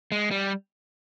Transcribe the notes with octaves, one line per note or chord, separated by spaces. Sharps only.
G#3
G3